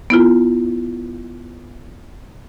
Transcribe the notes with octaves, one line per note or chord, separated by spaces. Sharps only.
B3 E4 F4